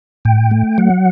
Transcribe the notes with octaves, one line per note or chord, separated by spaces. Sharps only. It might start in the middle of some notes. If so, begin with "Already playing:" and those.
A2 G5
A3
F#3 F#5